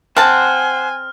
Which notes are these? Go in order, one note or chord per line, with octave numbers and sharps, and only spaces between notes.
C4 C5 F#5 G#5 A5 F6